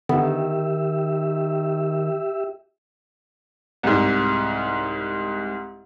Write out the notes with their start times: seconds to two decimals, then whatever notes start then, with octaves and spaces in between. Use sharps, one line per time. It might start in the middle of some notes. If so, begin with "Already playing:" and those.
0.09 D3 D#3 B3 G4 E5
3.83 C2 G#2